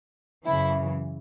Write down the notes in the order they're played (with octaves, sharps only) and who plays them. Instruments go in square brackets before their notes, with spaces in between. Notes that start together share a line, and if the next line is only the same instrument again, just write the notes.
[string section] F#2 C#3 E3 E4